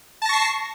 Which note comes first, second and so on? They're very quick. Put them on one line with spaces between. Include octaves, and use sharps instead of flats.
A5 A#6 C#6 C7